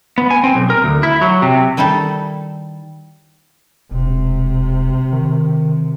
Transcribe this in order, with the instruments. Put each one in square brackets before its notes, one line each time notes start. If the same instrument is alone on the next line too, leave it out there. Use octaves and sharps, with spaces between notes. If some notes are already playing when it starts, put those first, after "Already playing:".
[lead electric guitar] B3
G#5
C4
B1
A#4
D2
E4
F#3
C3
[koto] D#3 G3 D#4 E4 A4
[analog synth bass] E1 [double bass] C3
[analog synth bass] D#3